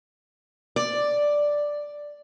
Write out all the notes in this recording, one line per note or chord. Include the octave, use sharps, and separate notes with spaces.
D5